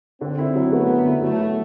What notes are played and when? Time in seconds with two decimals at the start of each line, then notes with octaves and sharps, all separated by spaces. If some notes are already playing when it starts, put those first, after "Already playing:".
0.21 D3 C4
0.38 E4
0.55 F#3
0.72 A3 B3
0.89 D3
1.06 E4
1.22 F#3 A3
1.39 F#3